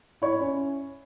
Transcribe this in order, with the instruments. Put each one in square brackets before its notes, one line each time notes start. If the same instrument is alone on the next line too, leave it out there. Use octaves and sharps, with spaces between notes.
[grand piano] E4 [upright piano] C#5
[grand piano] C#4